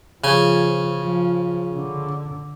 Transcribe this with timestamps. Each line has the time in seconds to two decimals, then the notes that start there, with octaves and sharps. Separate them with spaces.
0.24 C#3 F3 G#5
0.96 F3
1.74 D3